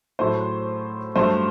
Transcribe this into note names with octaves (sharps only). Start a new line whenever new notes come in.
A2 F#3 A3 C5
G2 F#3 A3 C5